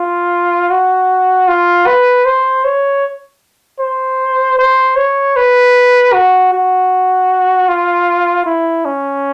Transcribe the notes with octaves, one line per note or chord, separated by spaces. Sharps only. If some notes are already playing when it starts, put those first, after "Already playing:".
Already playing: F4
F#4
F4
B4
C5
C#5
C5
C5
C#5
B4
F#4
F#4
F4
E4
C#4